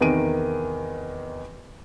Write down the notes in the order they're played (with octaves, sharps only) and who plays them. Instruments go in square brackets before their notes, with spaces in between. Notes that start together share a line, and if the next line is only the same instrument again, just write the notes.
[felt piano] E2 C3 D#3 A#4 D7 D#7